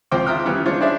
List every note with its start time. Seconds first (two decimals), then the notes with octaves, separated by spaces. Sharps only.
0.11 C#2 F3 C4 C5 G5 D6
0.27 F4 E5 G5 A#5 D#6 F6
0.46 C#3 E3 G3 B3 C#4
0.65 G#3 D4 F4 C5 C#5
0.81 D4 E4 G#4 C5 D5 E5